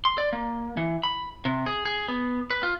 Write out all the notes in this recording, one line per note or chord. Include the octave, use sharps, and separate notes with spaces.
C6
D5
A#3
E3
B5
C3
G#4
G#4
B3
B4
F4